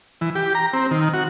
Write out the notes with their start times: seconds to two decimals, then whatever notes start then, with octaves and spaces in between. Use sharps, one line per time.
0.21 E3
0.35 G4
0.55 A#5
0.73 C4
0.91 D#3
1.14 F#4